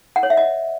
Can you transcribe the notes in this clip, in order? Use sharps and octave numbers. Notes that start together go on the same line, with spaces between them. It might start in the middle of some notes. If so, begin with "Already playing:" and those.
F#5
C#5
E5
D#5